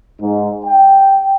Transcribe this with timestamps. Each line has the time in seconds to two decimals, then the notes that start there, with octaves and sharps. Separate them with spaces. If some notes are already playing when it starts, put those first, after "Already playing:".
0.21 G#2
0.66 G5